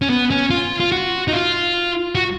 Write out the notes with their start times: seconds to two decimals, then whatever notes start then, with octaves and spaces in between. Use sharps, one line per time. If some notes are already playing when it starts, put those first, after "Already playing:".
0.02 C#4
0.10 B3
0.31 C#4
0.50 F4
0.80 F4
0.92 F#4
1.28 D#4
1.33 F4
2.15 F#4